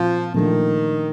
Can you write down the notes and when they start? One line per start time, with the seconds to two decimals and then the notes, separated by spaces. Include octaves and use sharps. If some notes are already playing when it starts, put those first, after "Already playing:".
Already playing: A#2 F3 C4
0.34 A#2 D#3 F3 A3 D4